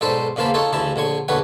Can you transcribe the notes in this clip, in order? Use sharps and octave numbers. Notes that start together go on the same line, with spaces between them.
B1 G#2 A4 C5 D5 B5
E2 C#3 A#3 C5 A5 B5
D#4 F4 A4 C#5
A1 D2 C#3 E4 A5
A#1 D3 C#5 C#6
A#1 E2 D3 F#4 B4 C#5